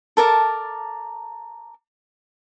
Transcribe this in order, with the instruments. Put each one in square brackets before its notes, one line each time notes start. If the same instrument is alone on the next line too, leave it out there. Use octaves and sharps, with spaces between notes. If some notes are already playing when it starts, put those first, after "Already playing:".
[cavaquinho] A4 A#4 D5 A5